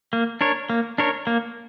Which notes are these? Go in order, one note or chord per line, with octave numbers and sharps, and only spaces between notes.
A#3
D4 A#4 C#5
A#3
D4 A#4 C#5
A#3